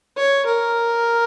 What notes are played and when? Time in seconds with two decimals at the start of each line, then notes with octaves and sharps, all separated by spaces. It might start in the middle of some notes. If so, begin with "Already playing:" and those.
0.17 C#5
0.46 A#4